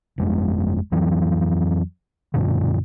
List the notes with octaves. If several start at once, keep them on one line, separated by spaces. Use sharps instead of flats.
G1 F2 G#3
F2 E3 F#3
F#2 A#2 D3